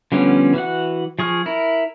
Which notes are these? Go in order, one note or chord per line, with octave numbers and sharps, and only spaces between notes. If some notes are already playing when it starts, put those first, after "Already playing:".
D3 F3 G3 B3 C#4
E3 F#4 F#5
F3 G#4 C#6 F6
E4 A#4